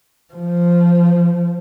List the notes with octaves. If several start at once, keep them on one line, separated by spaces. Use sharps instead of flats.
F3